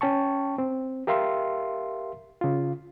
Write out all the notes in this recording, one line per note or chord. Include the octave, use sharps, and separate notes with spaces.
C#4 G5 A5 C#6
C4
G4 A#4 E5 F5 C6
C#3 F4